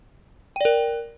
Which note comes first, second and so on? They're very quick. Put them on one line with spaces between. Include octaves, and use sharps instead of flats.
G5 D5 A#4